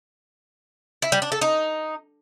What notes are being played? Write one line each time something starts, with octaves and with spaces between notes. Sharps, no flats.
E4
G3
D4
A4
D#4